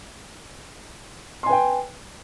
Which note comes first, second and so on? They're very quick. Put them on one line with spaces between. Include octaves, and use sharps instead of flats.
C6 G#5 B4 G5